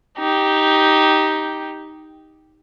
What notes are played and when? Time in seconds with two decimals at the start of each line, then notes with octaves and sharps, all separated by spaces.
0.18 D#4 G4